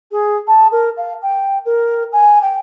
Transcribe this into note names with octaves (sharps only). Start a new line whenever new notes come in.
G#4
A5
A#4
F5
G5
A#4
G#5
G5